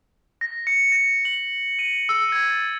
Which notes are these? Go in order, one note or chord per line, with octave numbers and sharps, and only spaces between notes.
A#6
C#7
A#6
F#7
D#7
E6
G#6
A6